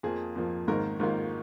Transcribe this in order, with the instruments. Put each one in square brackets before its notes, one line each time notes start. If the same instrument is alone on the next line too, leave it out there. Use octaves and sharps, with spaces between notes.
[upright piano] F2 F3 A#3 G#4
F2 F3 A#3
G#1 G#2 D#3 A#3 A#4
G#1 G#2 D#3 A#3 F4